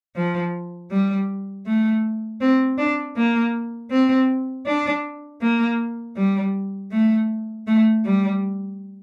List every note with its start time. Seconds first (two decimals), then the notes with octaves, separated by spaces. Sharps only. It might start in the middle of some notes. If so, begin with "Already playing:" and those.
0.16 F3
0.91 G3
1.66 A3
2.41 C4
2.78 D4
3.16 A#3
3.91 C4
4.67 D4
5.41 A#3
6.16 G3
6.92 A3
7.67 A3
8.05 G3